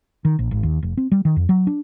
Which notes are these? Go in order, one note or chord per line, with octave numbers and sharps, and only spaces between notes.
D#3
A#1
G#1
D#2
F1
C4
G3
D#3
F2
F#3
D4